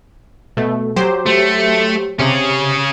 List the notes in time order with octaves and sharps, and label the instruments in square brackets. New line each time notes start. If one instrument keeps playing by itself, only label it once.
[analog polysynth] B2 A3
F#3 G4 C5
[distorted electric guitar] A3
[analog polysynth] C3 [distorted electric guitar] C#4 G#4